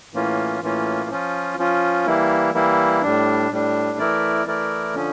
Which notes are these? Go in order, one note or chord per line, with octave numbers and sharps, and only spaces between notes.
A2 E3 A#3 C#4 F4
A2 E3 A#3 C#4 F4
F3 C#4 F4
F3 C#4 F4
E3 G3 A#3 E4
E3 G3 A#3 E4
A2 G3 D4
A2 G3 D4
E3 A3 E4 A#4 D5
E3 A3 E4 A#4 D5
D3 F3 C#4